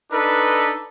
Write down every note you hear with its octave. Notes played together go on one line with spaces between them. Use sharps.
D4 D#4 A4 B4